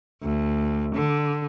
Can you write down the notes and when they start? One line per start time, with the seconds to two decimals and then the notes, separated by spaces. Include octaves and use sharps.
0.23 D2
0.95 D3